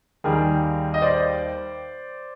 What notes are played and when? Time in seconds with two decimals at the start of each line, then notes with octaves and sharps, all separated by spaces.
0.24 D#2 D#3 G3 G#4 A#4
0.94 D#5
1.02 C5 D5